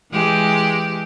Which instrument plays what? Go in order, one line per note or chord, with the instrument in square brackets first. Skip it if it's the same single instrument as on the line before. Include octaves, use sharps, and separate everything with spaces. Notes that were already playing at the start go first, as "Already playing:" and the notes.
[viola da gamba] E3 G#3 G4